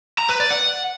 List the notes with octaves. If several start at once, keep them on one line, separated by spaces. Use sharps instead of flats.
A#5
B4
D5
F#5